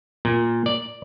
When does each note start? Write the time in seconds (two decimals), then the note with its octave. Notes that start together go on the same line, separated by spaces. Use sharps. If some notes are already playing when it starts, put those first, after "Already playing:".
0.25 A#2
0.66 D5